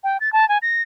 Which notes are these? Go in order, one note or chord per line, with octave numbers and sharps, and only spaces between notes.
G5
A6
A5
G#5
A#6